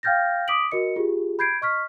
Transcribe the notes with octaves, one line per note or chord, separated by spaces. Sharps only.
F5 G5 F6 G6 A6 A#6
D6 D#6 B6 D7 F#7
F#4 A#4 D#5 C#7
F4 G4 G#4
B5 G6 G#6 C7 D7
D#5 C#6 F6 B6